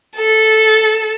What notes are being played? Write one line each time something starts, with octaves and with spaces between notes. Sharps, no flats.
A4